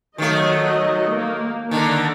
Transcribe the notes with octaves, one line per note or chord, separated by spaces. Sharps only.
D#3 F#3 A3 D#5
A#3
D3 D#3 D4 A#5